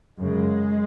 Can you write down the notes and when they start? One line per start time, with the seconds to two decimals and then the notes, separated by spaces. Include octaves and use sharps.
0.18 F#2 C#3 G#3